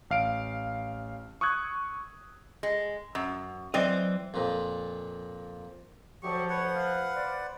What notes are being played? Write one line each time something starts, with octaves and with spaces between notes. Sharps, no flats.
A1 F5 D7
C#6 D#6 E6 F#6 G#6
G#3
F#2
E3 F#3 C4 D5 D#5
F2 A#2
D2 F3 F#3 G4 C#6
B4 C#5 F#5
F5
C5 D5